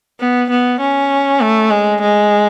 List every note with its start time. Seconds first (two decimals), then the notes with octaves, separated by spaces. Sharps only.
0.20 B3
0.50 B3
0.80 C#4
1.41 A3
1.71 G#3
2.01 G#3